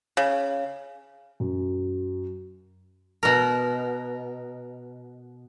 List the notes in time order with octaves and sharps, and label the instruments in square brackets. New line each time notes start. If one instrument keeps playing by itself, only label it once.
[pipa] C#3
[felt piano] F#2
[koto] B2 A#4